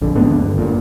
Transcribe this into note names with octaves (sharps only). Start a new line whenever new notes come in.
A#1 F2 D3
G#2 A3 B3 D4
E2 D3
G1
G2 A#2